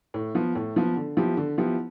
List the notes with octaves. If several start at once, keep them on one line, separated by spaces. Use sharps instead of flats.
A2
F3 B3
A2
F3 B3
D3
F3 B3 E4 G4
D3
F3 B3 E4 G4